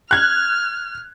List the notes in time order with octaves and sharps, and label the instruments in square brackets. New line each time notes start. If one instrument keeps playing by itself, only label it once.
[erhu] F6 [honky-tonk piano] F#6 G#6